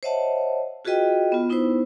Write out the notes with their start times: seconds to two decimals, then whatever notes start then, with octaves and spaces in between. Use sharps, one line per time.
0.03 C5 C#5 D#5 E5 F#5 A5
0.85 F4 F#4 G#4 B4 D#5 G5
1.32 B3 F4
1.49 B3 D#4 E4 B4 C5